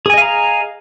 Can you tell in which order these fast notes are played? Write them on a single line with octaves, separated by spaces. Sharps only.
G#4 G#5 D#5 F5 A#5